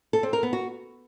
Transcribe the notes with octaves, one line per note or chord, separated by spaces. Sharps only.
A4
C4
A#4
B3
F#4